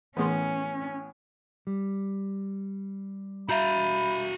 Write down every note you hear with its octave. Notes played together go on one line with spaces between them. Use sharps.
A2 E3 B3 C#4 G#4 C6
G3
F#4 E5 F5 A#5 B5 G6